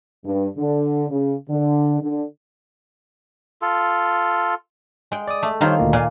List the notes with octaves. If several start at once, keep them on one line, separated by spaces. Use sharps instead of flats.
G2
D3
C#3
D3
D3
F4 A4
G#3 G5
D5 D6 D#6
A3
D#3 G3 D#4 F4 C5 C#5
D2 A#2 A#3
A#2 F5 G#5